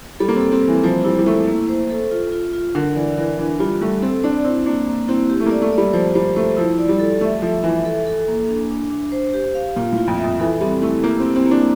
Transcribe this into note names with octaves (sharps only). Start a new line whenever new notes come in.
G3 A4
A#3
C4
A4
C4
G3
E3
F3 C5
G3 E4
G3
A3 E4
A#3
C5
A4
F4
F4
F4
D3 A#4
E3 D5
E3 A#4
E3 D4
G3 F4
G3 A3
C4 A4
D4 D5
C4 E4
A#3 D4
A#3
C4 E4
G4
A3
A#3
D5
A3
D5
G3
F3 C5
G3 C5
A3 C5
F3 E4
D5
G3
A4
A3 E5
F3 E5
E3 E5
A4
A4
A#3
D4
D4
D4
C5
G4
F5
A#2 F4
A2
F4
F2
E5
F2
E3 A4
G3 C4
A3 E4
A#3 G4
C4
E4
C4
A#3
D4